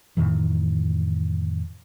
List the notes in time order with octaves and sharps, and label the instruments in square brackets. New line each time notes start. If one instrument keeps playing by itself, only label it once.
[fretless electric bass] F2 A2 D#3 E3